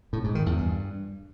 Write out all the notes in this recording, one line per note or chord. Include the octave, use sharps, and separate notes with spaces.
A2
G#2
D#3
E2
G2